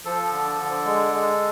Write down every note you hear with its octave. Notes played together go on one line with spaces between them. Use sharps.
F3 A4
D3
D3
G#3
G#3